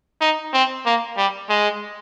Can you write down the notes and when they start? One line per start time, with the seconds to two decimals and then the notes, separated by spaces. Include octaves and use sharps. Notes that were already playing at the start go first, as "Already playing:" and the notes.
0.21 D#4
0.53 C4
0.86 A#3
1.17 G3
1.49 G#3